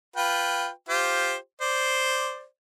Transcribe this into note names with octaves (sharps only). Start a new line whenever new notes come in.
F4 B4 G5
F4 G4 C5
C5 D5